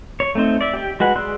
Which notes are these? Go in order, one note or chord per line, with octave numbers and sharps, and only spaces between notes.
C#5
A3 C4 D#4 C5
D5 E5
G4 G5
G#3 F#4 B4 F#5
G#4 D5 C6 E6 F#6